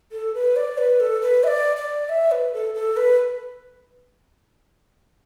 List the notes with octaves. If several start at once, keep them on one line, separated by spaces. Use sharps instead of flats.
A4
B4
D5
B4
A4
B4
E5
D5
D5
E5
B4
A4
A4
B4